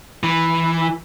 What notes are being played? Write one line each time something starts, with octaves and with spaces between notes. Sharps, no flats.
E3